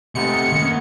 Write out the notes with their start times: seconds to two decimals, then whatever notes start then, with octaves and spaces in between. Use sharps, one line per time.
0.15 C3 G#3 A3 B3 D#4 C#7
0.52 F#2 D#3 A#3 C#4 F5 G#5